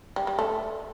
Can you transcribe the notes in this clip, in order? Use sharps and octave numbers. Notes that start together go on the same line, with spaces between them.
G3
G3
A3